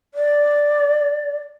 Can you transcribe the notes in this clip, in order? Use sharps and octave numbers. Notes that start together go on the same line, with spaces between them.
D5